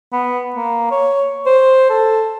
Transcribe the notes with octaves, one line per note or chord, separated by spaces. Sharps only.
B3
A#3
C#5
C5
A4